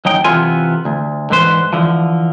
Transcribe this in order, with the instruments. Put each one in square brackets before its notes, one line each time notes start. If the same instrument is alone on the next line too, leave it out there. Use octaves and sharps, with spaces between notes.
[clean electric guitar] D#2 F#3 D#4 G5
C3 E3 B3 F4 A4 G#5
D2
G#2 D3 E3 B4 C5
D3 E3 F3